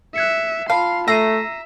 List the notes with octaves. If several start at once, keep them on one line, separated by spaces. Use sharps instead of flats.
E5 F#6 G#6 C#7
F4 F5 A5 B5 C6
A3 E5 A#5 E6 C7 D#7